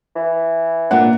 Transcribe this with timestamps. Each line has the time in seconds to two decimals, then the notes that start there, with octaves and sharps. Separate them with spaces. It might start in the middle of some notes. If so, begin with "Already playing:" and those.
0.16 E3
0.91 A#2 D4 F#5